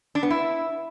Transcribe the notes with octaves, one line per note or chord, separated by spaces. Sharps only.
D4
B3
E4